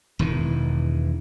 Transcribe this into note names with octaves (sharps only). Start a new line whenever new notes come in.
E1 D#3 E3